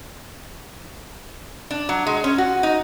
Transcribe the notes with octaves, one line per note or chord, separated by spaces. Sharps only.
D4
F#3
G#3
C#4
F#4
D#4